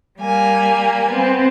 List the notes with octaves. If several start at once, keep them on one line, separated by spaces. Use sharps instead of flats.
G3 A#3 G#5
B3 C4